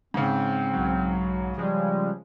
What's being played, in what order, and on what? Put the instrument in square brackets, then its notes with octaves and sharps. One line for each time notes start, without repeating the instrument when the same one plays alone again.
[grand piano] G#2 C#3 [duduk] C4
[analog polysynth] B1 F#3
[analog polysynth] C#3 F3 G#3 [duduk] G3